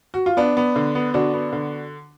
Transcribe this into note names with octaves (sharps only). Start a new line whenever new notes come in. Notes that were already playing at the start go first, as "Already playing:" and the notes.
F#4
F4
B3 D4
B3
D3
B3
D3 D4 F#4
B3
D3